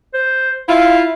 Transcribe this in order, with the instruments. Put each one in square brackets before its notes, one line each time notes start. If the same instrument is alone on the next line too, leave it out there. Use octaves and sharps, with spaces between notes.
[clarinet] C5
[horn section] E4 F4 [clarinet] F5